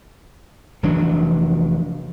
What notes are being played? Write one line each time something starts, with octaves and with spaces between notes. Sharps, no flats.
F1 E3 F#3 D4